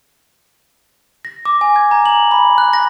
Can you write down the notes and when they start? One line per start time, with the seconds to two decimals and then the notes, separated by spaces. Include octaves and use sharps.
1.25 A#6
1.45 D6
1.61 G#5
1.76 G#6
1.91 A#5
2.06 F#7
2.31 B5
2.58 F#6
2.73 A#6